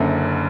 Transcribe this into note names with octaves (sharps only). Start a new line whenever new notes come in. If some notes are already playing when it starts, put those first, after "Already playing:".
Already playing: F#1 F#2 D3